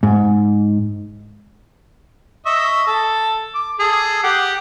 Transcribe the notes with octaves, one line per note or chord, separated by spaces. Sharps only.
G#2
D#5 E5 C#6
A4
D6
G#4 A4
G4 F#5